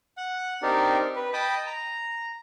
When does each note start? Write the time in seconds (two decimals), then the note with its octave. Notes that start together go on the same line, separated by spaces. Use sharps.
0.17 F#5
0.62 C4 D4 D#4 G4 A#4 D5
1.16 B4
1.33 D#5 G5 A5 B5 D#6
1.66 A#5